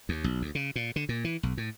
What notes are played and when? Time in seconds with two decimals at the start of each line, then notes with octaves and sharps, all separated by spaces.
0.09 D#2
0.24 B1
0.42 D2
0.55 C#3
0.76 A#2
0.96 D3
1.09 A#2
1.24 E3
1.43 B1
1.57 A2